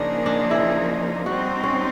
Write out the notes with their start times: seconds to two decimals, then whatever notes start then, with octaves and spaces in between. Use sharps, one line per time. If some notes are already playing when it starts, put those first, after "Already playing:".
Already playing: C#3 F3 A#3 D4 D#4 G#4
0.26 D4
0.51 E4
1.26 G3 C4 D#4 F#4
1.63 C#4